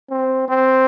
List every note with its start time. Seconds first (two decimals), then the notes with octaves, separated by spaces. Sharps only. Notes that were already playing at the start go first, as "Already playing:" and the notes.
0.10 C4
0.49 C4